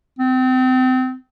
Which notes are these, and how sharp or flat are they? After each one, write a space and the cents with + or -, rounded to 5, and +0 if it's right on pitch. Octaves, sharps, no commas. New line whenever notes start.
C4 -30